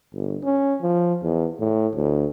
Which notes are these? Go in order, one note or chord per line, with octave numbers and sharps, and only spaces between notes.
G1
C#4
F3
E2
A2
D2